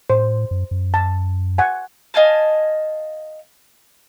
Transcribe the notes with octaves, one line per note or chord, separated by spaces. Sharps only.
A2 C5
F#2
F#2
A5
F#5 G#5
D#5 F5 G#5 A5